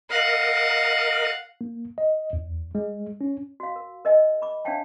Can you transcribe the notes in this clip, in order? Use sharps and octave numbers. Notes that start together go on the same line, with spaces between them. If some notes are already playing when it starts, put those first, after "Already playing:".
A#4 D#5 F5 F#5
A#3
D#5
E2
G#3
C#4
F#4 F5
A#4
A#4 D#5 E5 G#5
B5 D6
D4 C#5 E5 F5 G5 A5